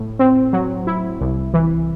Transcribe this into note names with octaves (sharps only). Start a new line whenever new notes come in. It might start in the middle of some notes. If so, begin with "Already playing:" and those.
Already playing: A2
C4
F#3
E4
C2
E3